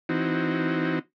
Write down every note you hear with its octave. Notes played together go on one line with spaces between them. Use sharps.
E3 C4 D#4 F#4